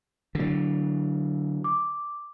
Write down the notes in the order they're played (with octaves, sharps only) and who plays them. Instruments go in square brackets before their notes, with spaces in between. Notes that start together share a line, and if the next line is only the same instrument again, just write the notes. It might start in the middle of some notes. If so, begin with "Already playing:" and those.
[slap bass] D3 F#3
[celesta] D6